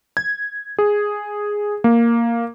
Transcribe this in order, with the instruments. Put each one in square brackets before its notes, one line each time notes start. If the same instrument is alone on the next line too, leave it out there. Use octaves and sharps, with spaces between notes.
[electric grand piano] G#6
G#4
A#3